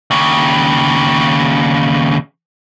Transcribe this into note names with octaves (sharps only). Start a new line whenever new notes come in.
D#2 C#3